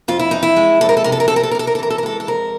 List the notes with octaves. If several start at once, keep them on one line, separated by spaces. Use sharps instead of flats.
F2 F4
E4
E3 D#4
E4
G#3
F2 A4
A#4
A4
C3 A#4
A4
A#4
C3 A4
A#4
A4
A#4
C3 A4
A#4
A4
E3 A#4
A4
A#4
G#3 A4
A4
F2 A#4